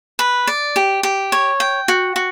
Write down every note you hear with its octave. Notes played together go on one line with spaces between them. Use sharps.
B4
D5
G4
G4
C#5
G5
F#4
F#4